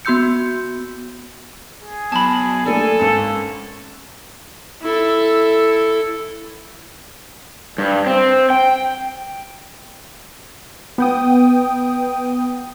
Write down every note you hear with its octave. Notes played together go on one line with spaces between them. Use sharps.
B3 F#4 C6 E6 G6 C#7
G#4
B2 F#3 A5 B5
A3 A#3 D4 A4 G#5
G#1 C#4 E6
E4 A4
G2
C4
G5
B3 G5 D#6